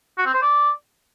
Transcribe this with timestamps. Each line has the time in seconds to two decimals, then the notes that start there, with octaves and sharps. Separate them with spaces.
0.18 F#4
0.26 C4
0.34 C5
0.42 D5